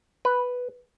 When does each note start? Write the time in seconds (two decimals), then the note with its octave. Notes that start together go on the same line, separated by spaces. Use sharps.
0.25 B4